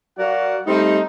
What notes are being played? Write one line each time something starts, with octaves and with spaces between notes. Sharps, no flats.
F#3 F#4 A#4 D5 F5 F#5
G3 A3 C4 D#4